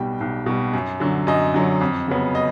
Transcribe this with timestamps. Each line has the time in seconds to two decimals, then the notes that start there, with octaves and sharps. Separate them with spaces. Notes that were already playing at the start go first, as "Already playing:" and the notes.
Already playing: B1 B2 G3 G5
0.20 B1
0.46 B2 G3
0.73 F#2
1.00 D3 F#3
1.27 F#2 D#5
1.54 D3 F#3
1.81 F2
2.08 C#3 F#3 B3
2.35 D#5